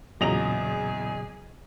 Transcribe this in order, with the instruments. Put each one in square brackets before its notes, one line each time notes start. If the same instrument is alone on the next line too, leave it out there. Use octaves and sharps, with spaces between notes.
[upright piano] E2 A#5 F7 [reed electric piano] A#2 C#3 F#3 [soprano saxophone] G#4 [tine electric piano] D#5